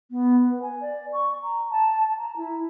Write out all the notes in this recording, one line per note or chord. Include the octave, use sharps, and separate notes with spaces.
B3
B4
G#5
D5
C#6
A#5
A5
A#5
E4